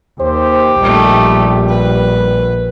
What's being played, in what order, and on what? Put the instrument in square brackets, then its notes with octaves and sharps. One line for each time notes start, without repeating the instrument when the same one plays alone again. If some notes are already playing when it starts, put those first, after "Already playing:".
[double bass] D#2 [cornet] G4 [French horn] C5
[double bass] A#1 [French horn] G3 [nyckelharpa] A3 D#4
[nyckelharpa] B4